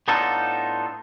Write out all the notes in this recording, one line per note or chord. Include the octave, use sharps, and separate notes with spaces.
A2 B3 D4 D#4 F4 A4